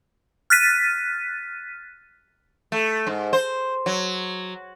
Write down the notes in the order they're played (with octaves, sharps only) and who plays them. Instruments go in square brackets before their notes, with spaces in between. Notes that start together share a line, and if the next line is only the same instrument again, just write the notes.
[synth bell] F6 F#6 A6 B6 D#7
[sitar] A3
G#2
C5
F#3